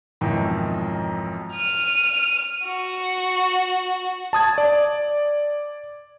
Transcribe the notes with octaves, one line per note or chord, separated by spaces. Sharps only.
B1 F2 G#2 D#3 E3
F6 D#7
F#4
A5 D#6 G#6
D5